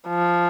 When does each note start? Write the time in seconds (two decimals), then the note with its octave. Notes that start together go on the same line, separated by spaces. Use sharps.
0.08 F3